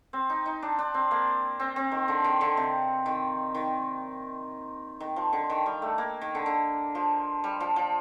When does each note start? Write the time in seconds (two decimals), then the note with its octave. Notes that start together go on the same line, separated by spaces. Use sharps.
0.13 C4
0.30 D#4
0.46 D#4
0.62 D4
0.79 D4
0.94 C4
1.11 A#3
1.60 C4
1.76 C4
1.92 D#3
2.08 D3
2.24 D#3
2.41 D3
2.57 C3
3.06 D#3
3.54 D#3
5.00 D#3
5.16 F3
5.33 D3
5.50 D#3
5.66 G3
5.82 A3
5.98 A#3
6.22 D#3
6.35 D3
6.46 D3
6.95 F3
7.44 G3
7.60 F3
7.76 F3